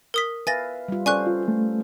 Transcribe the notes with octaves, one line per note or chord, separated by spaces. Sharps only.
A#4 D#6 B6
B4 E5 F5 G#5 A6 A#6
G3 F4
C#4 A4 C5 D5 G#5 C#6 F#6
F4
A3